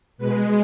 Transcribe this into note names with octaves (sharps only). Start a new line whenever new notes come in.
B2 G#3 B4